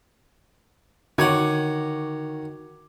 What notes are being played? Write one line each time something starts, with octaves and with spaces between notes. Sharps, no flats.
D3 D#3 F#4 C#5 F#5 D6 G#6